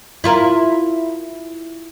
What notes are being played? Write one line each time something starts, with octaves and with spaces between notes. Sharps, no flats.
E4 F4 A#4